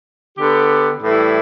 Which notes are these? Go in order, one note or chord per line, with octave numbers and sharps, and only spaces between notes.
D3 B3 G4
A2 E3 G3 E4